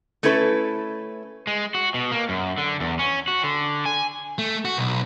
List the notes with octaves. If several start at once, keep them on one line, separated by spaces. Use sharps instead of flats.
A3 C#4 E4 A4 B4
G#3
F#4
B2
A#3
F#2
D3
E2
C#4
F#4
D3
G#5
A3
F#4
B1